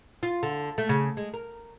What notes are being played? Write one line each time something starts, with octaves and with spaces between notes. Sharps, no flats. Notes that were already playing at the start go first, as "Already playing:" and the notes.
F4
D3
A3
C#3
G#3
A#4